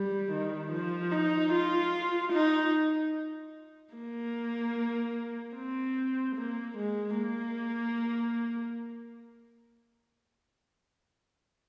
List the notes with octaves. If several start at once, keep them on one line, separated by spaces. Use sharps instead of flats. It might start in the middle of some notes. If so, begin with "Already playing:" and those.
Already playing: G3
D#3
F3
D#4
F4
D#4
A#3
C4
A#3
G#3
A#3